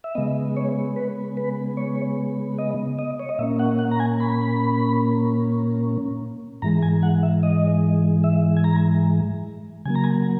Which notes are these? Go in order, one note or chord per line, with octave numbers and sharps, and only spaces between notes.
E5
C#3 G#3 B3 D#5
C#5
B4
B4
C#5
D#5
D#5
C#5
D#5
A#2 A#3 C#4 E5
F#5
F#5
A#5
G#5
B5
G#2 E3 G#3 A#5
G#5
F#5
E5
D#5
E5
G#5
A#5
C#3 F#3 A#3 G#5
A#5
G#5